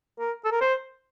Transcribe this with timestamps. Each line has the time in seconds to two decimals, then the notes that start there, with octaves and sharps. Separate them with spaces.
0.19 A#4
0.45 A4
0.52 A#4
0.61 C5